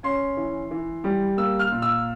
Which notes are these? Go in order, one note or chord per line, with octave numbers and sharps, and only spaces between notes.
C#4 C6
E3
E3
G3
A#3 E6
F6
A#2
E6